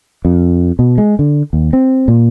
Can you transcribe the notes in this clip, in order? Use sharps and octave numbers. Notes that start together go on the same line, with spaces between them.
F2
B2
G#3
D3
D#2
C4
A#2